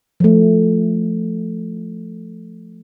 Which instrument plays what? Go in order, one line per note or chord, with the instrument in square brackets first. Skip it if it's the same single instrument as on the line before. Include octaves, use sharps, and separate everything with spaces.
[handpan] F3 A3